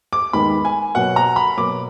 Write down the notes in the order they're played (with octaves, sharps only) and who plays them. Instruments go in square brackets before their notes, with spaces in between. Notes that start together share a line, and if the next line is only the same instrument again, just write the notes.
[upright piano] D6
D#2 D#3 G#3 B3 B5
G#5
B2 F#3 A#3 F#5
A#5
B5
B2 F#3 A#3 D6